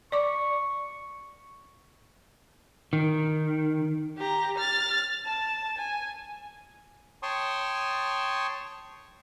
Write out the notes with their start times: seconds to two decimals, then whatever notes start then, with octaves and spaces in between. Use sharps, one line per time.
0.12 D5 C#6 D6
2.93 D#3
4.17 G4 A#5
4.58 F6 A6
5.25 A5
5.78 G#5
7.23 C#5 G5 A5 C6 C#6 D#6